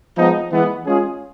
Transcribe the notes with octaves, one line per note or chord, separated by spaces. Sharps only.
F3 G#3 B3 D#4
E3 G#3 B3
G#3 C#4 F4 G#4